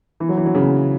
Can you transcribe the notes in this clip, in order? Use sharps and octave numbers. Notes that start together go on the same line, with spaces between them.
E3
F#3
E3
F#3
C#3 E3